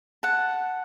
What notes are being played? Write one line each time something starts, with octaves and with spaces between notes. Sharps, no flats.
F#5 A5